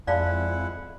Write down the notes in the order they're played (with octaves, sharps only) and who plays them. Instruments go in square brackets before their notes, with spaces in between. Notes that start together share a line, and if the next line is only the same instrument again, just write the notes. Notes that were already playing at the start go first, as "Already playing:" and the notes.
[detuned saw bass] F2 [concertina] G#3 E4 F#5 [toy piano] D5 F5 A5